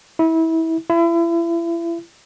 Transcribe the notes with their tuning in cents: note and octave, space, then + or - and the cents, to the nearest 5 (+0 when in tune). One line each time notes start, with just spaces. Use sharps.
E4 -25
E4 +35